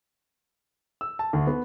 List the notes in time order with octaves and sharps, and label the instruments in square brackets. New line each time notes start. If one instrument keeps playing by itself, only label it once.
[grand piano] E6
A5
D2
B3